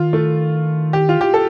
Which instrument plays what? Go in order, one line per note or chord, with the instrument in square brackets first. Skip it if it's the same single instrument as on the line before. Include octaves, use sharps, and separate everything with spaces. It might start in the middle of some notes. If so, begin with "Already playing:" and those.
Already playing: [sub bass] D#3 [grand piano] F4
[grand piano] A3
G4
F4
G4
A4